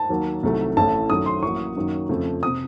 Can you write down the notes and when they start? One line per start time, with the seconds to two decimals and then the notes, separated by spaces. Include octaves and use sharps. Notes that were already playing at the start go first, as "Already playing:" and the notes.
Already playing: A5
0.09 D#2 D#3 F#3 A#3
0.43 C2 C3 D#3 F#3 A3
0.77 A1 A2 A3 A5
1.10 F#2 D#3 F#3 A3 D#6
1.26 C6
1.42 A1 A2 F#3 A#3 C#6
1.76 F#2 D#3 F#3 A#3
2.09 F2 C#3 F3 A3
2.43 C3 D#6